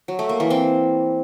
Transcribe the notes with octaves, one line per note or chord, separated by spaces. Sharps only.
F#3
A3
A#3
E3
C4